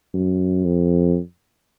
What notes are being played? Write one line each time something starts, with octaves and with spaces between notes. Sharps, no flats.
F#2
F2